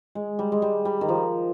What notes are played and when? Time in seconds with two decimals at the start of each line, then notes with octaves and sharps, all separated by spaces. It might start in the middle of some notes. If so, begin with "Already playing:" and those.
0.15 G#3
0.39 G3
0.52 G#3
0.62 G3
0.85 G3
1.01 D#3
1.09 F3